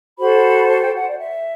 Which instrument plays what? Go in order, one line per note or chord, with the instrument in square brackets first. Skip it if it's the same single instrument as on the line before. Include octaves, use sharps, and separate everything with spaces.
[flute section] F#4 A4 C5 B5
A5
G5
F#5
D5
E5